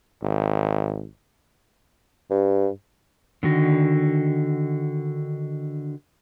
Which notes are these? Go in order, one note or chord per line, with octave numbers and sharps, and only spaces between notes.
G#1
G2
D3 D#3 F#4